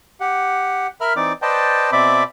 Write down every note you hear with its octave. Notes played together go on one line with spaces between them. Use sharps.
G4 F#5
A#4 E5 B5 F6
E3 C4 D#4 D5 D6
B4 C5 D5 D#5 G5 A5
B2 C4 D5 E5 B5 D6